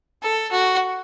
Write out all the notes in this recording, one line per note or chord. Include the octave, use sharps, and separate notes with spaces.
A4
F#4